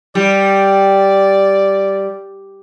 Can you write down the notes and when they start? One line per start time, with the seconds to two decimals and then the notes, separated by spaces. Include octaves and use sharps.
0.15 G3 D5